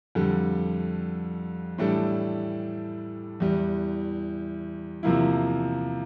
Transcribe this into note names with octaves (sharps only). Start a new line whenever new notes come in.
F2 D3 G3
A2 E3 G3 D4 A4
E2 E3 G3
E2 C3 F3 A#3 E4